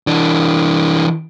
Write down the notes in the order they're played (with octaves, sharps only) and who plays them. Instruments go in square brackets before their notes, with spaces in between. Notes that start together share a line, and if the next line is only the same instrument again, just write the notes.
[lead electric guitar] E3 D4